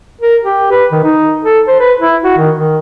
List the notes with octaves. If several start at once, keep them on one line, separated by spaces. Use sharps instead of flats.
A#4
G4
B4
D#3
D#4
A4
C5
B4
E4
F#4
D#3
D#3